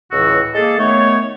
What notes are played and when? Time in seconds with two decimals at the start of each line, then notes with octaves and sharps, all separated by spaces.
0.11 C#2 A2 E3 F#4 E6
0.55 G#3 A#3 G#4 A4
0.79 D#3 A3 B3 C#5